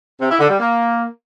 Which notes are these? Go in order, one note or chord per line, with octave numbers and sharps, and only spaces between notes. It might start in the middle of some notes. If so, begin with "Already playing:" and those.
C3
E4
D3
G3
A#3